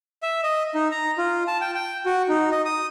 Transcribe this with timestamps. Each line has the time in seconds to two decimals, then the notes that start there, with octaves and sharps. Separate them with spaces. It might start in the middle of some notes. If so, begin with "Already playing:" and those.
0.23 E5
0.44 D#5
0.75 D#4
0.92 A#5
1.18 F4
1.48 A5
1.61 G5
1.75 G5
2.06 F#4
2.29 D#4
2.52 D#5
2.65 D#6